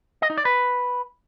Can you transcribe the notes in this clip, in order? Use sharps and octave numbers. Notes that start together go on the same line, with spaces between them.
D#5
D#4
D5
B4